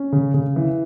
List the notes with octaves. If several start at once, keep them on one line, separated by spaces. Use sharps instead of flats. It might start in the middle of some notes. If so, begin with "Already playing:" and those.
Already playing: C#4
C#3
C#3
E3